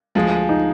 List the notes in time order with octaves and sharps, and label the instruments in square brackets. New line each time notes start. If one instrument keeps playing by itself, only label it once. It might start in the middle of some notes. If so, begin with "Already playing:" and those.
[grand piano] D2 [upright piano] F3 G#3
[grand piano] D#4